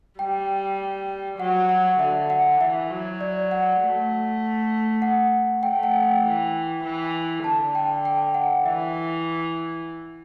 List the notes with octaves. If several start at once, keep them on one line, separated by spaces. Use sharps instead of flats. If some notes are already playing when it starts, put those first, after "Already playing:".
G3 G5
F#3 F#5
F#5
D3 E5
F#5
E3 E5
F#3
D5
F#5
A3
F#5
A3 G5
F#5
G5
E3
E3
D3 A5
G5
G5
F#5
E3 E5